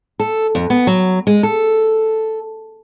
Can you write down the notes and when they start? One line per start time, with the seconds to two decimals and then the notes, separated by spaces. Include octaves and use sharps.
0.20 A4
0.55 F2
0.70 B3
0.87 F#3
1.27 G#3
1.43 A4